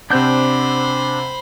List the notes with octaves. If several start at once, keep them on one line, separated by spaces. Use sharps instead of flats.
C3 C4 D4 C5 F#5 B5 G6